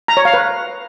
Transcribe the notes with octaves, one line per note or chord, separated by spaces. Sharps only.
A#5
C#5
F5
B4